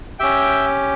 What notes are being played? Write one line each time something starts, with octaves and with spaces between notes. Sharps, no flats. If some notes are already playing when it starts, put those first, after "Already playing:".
C#4 G4 E5 G5